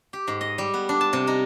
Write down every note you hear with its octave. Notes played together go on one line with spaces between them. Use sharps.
G4
G#2
D#5
G3
B3
D4
A5
C3
D#4